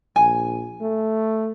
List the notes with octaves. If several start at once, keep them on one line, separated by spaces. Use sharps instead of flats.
A#1 G#5
A3